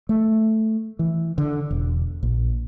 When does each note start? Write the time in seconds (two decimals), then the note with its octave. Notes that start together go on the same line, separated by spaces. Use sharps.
0.09 A3
0.99 E3
1.38 D3
1.71 E1
2.23 A#1